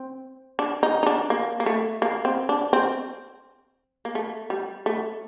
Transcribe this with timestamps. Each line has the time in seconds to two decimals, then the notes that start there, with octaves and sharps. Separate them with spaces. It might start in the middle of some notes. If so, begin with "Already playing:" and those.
Already playing: C4
0.59 D4
0.83 D#4
1.03 D#4
1.07 D4
1.30 A#3
1.60 A#3
1.66 A3
2.02 A#3
2.25 C4
2.49 D4
2.73 C4
4.05 A#3
4.15 A3
4.50 G3
4.86 A3